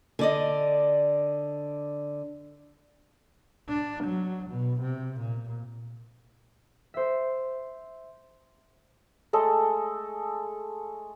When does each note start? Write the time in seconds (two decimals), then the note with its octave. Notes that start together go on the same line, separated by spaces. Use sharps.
0.19 D3 D5 D#5
3.69 D4
4.04 F#3
4.50 B2
4.81 C3
5.21 A#2
6.94 C5 E5
9.33 G#3 A3 A4 D#5